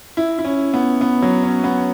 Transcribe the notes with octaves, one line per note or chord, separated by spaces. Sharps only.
E4
E4
C#4
B3
B3
F#3
C#4
B3